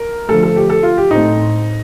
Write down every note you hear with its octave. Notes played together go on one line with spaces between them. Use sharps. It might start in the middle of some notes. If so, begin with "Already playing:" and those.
Already playing: A#4
D3 F3 A3 A4
A4
G4
A4
F4
G4
A2 A3 C4 D#4